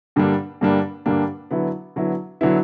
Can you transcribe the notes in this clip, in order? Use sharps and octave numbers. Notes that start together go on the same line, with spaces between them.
G2 D3 G3 A#3 D4
G2 D3 G3 A#3 D4
G2 D3 G3 A#3 D4
D3 F#3 B3 E4
D3 F#3 B3 E4
D3 F#3 B3 E4